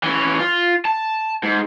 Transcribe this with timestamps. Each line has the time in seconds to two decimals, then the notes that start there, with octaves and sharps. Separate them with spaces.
0.03 E3 C#4
0.39 F4
0.85 A5
1.43 G#2